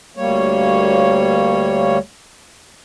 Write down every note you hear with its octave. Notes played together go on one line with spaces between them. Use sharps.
D2 G3 A#3 C#5